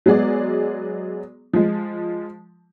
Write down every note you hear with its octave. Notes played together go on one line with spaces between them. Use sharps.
F#3 G#3 B3 G#4 D5
F3 G#3